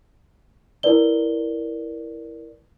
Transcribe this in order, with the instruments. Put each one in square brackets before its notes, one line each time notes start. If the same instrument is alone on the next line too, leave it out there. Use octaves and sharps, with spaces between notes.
[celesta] E4 A#4 B4 D5 G7